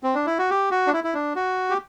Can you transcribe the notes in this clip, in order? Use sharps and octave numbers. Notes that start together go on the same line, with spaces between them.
C4
D4
E4
F#4
G4
F#4
D4
E4
E4
D4
F#4
G4